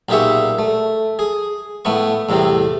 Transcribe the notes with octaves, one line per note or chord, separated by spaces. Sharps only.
B1 A#2 G4 G#4 E5 C#6
A3
G#4
A2 A3 B3 C#6
E2 A2 C3 G3